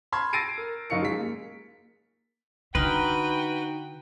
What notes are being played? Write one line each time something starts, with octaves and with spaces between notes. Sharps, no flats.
A5 B5 C6 F6 G#6
E6 A6 A#6 C7 D7 D#7
A#4
F#1 D#4 F5 C#6 C#7
G#3 B6
A#3
D3 D#4 F#4 B4 G5 C6 F6